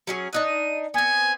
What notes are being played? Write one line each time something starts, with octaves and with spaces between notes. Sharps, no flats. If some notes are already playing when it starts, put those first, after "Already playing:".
F#3 C#4 G#4
D4 D#4 D#5 F#6
D#7
B3 C4 G#5